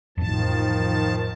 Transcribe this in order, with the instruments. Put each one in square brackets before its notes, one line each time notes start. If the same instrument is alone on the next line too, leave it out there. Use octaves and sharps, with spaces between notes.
[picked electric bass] A1 F2 [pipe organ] D#3 F3 A5